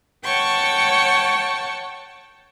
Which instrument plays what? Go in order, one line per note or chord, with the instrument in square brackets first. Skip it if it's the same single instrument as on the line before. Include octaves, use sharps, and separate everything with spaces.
[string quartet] C#5 F#5 G5 A5 C#6